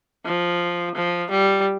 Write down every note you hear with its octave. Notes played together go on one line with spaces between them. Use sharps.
F3
F3
G3